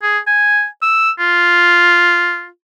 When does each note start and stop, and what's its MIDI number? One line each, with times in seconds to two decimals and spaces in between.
0.02 0.18 68
0.27 0.66 80
0.82 1.10 88
1.19 2.47 65